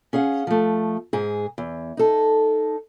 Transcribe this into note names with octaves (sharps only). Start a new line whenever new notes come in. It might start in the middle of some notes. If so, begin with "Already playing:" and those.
C#4 G#4 F5 F#5
F3 A3
G#2 G#4
E2
D#4 A4